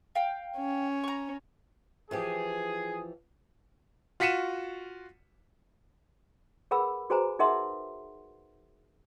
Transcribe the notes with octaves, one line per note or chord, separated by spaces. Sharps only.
F5 G5
C#4
A#5 C#6
E3 F3 G4 G#4
F4 F#4 B6 C#7 D#7 E7
G#4 A#4 B4 F#5 B5 E6
F#4 G#4 B4 C5 G#5 A#5
D#4 G#4 A#4 E5 F#5 C6